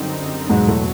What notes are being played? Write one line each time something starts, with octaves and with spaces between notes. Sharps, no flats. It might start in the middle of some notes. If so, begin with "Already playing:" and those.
Already playing: F#2 D3 G3 C4 D#4
E2 G#2 B2 F#3 G#3
A2 A3